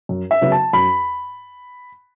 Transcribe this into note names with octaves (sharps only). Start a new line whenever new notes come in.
F#2
E5
C#3 F#3 B3
A5
F#2 B5